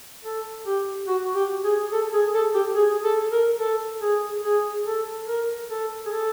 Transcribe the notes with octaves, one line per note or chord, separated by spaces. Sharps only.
A4
G4
F#4
G4
G#4
A4
G#4
A4
G4
G#4
A4
A#4
A4
G#4
G#4
A4
A#4
A4
G#4
A4